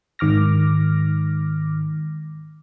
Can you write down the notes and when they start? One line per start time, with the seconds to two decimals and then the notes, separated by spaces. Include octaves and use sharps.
0.19 G#2 D#3 D6 F6 A#6